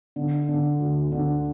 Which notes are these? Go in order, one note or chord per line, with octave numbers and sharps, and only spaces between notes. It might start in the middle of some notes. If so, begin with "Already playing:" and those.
D3
D3
D2
D3